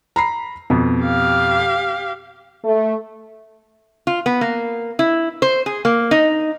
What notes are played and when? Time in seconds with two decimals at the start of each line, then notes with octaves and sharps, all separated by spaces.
0.16 A#5 B5 C7
0.70 F2 B2
1.03 G4 F5
2.64 A3
4.07 F4
4.26 B3
4.41 A#3
4.99 E4
5.42 C5
5.66 G#4
5.85 A#3
6.11 D#4